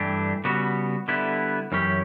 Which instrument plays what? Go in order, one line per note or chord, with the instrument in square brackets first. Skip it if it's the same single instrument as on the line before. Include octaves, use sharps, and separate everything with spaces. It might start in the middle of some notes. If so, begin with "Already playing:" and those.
Already playing: [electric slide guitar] G2 E3 A3 D4 G4
C#3 G3 B3 F#4
D3 G3 B3 E4
F#2 E3 C#4 G4